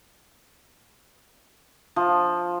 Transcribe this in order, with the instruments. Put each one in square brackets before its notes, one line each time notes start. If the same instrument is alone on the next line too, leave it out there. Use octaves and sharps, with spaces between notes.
[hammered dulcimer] F3